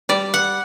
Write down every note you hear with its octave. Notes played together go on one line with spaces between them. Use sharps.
G3 D5
F#5